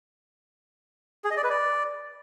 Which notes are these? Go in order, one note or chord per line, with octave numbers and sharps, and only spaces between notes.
G#4
D#5
D5
B4
D5